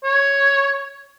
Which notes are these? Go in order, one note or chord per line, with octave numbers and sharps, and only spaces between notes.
C#5